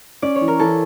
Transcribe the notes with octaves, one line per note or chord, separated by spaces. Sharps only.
C#4 D5
C#5
E3
A#4
E3 A4